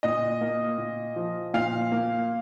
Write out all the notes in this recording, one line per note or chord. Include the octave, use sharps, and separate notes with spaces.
A#2 D#5
A#3
A#2
F3
A#2 F5
A#3